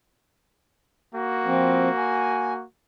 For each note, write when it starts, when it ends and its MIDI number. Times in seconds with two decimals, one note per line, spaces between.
1.14 2.64 58
1.14 2.64 66
1.46 1.89 53
1.46 1.89 60
1.97 2.53 80